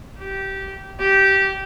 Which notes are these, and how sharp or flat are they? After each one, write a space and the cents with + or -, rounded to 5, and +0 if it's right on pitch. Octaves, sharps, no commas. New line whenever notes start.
G4 -15
G4 -15